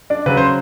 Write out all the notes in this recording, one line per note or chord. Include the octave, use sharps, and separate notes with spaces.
D4 D5
C#3 F#3 B4
C5